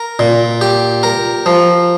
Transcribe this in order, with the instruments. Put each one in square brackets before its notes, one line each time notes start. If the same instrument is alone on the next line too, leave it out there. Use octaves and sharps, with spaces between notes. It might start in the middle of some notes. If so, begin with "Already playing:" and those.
Already playing: [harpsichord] A#4
A#2
G4
A#4
F3